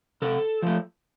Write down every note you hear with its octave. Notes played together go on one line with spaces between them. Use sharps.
C3 A4
F3 A3